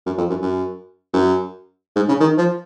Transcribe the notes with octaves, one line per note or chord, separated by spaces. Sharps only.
F#2
F2
F#2
F#2
F#2
G#2
C#3
D#3
F3